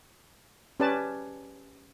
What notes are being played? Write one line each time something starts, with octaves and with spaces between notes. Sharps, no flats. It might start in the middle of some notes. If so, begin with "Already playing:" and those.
C#4 G4 B4 D5 A5